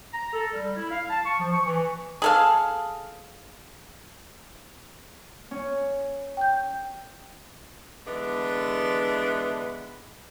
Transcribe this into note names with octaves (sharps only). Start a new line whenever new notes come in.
A#5
A4
G3
E4
F5
A5
C#6
F3
C#6
E3
G#4 A4 F5
C#4
G5 G6
D3 E3 G#3 B3 D4